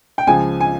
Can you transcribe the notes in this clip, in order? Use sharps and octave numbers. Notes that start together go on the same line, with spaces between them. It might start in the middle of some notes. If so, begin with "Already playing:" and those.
G5
C#2 C#3 F3 G#5
G#5